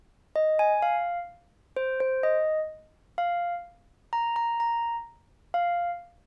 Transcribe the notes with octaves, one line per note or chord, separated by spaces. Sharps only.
D#5
G#5
F5
C5
C5
D#5
F5
A#5
A#5
A#5
F5